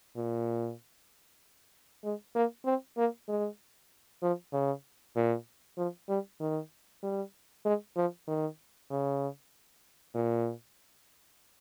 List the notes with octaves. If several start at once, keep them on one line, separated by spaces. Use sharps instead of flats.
A#2
G#3
A#3
C4
A#3
G#3
F3
C#3
A#2
F3
G3
D#3
G3
G#3
F3
D#3
C#3
A#2